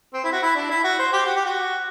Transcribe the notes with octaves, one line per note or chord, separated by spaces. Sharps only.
C4
E4
F#4
E4
D4
E4
F#4
C5
G4
F#4
G4
F#4